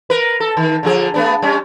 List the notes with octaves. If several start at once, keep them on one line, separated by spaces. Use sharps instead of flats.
A#4 B4
A4
D#3
D3 F3 G#4
A3 B3 D4
G3 C#4